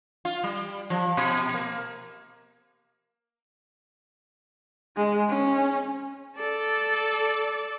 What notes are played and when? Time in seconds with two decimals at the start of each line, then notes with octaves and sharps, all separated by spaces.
0.25 F4
0.43 G3
0.90 F3
1.17 B2
1.54 A#3
4.97 G#3
5.29 C#4
6.36 A4 D5